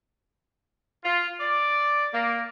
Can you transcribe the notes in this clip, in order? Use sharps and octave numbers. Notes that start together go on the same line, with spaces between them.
F4
D5
A#3